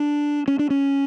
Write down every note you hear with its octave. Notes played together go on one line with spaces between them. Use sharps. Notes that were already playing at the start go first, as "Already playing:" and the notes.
Already playing: D4
C#4
D4
C#4